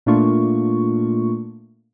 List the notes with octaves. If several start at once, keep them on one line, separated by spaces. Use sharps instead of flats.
A#2 A3 A#3 D4 F4 C#6